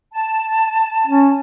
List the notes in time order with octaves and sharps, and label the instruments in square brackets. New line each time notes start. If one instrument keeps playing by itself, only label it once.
[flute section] A5
[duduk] C#4